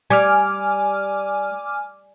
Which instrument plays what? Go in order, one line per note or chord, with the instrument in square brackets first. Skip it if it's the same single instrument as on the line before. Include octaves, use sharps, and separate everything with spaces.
[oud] G3 [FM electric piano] G#5 D6 F6